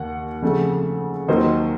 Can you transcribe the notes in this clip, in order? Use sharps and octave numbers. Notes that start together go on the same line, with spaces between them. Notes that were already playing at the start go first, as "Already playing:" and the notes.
Already playing: D#2 D#3 A#3 F#5
F2 C#3 A3
D#2 D#3 F#3 C5 D#5